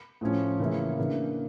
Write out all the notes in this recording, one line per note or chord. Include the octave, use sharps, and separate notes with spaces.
A2 F3 C#4
C#3 E3 A#3 C#4 E4
C#3 E3 A#3 D4